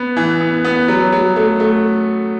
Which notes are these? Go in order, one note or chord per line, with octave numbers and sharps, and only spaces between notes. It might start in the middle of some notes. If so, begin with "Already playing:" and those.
Already playing: B3
E3
B3
B3
F#3
F#3
A3
A3